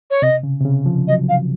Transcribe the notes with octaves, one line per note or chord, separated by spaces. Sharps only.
C#5
C3 D#5
C#3
C3
C#3
F3
F#3 D#5
F5